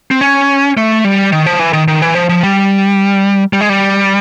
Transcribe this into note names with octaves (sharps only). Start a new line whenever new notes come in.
C4
C#4
A3
G3
D#3
F3
E3
D#3
D#3
E3
F3
F3
G3
G3
G#3
G3